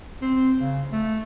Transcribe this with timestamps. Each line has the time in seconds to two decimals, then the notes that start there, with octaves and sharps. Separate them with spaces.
0.21 C4
0.59 C#3
0.92 A3